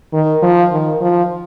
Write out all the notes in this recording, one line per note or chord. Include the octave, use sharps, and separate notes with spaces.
D#3
F3
D#3
F3